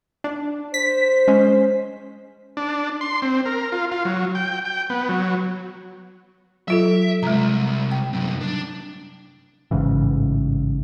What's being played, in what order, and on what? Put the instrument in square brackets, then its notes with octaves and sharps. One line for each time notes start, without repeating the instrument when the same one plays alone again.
[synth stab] D4
[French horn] C5 [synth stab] B6
[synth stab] G#3 C#4
[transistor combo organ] D4
C6
C4
A#4
F4
F4
F#3
G5
G5
B3
F#3
[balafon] F#3 F4 A4 [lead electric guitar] E5
[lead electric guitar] C2 [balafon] G#3 A#5
[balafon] G5
[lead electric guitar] C2 F#2
D4
[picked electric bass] A1 G#2 C#3 E3